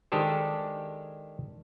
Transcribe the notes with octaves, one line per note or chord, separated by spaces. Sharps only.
D#3 G#3 D4 G4 A4 C5